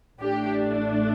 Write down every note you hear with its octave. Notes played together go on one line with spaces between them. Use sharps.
A1 A2 A3 D4 G4